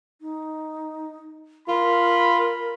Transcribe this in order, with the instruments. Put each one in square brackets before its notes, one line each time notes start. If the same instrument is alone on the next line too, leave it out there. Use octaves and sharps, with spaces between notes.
[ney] D#4
[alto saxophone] F4 [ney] A#4 [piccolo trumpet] B5